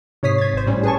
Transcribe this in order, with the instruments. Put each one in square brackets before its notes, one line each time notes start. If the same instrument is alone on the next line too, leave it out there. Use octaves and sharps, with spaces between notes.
[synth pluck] G#2 C3 C#5 D#6 B6 C7
G#6 A6
G#1 C5
A2 G3 C#4
G#4 B4 G#5 A5 C#6